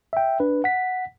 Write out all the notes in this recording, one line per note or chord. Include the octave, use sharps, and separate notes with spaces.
E5 G5
D4 B4
F#5 B6